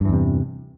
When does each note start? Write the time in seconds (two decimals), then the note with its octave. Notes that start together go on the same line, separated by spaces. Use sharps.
0.01 G2
0.05 E3
0.09 E2
0.13 C3